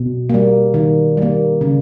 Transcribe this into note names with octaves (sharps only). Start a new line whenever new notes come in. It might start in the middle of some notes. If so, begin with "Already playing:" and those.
Already playing: B2
G3 A#3
D#3
G3 A#3
C#3